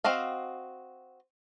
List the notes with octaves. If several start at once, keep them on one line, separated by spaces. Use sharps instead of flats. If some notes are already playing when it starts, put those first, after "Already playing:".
C4 F#4 D#5 F5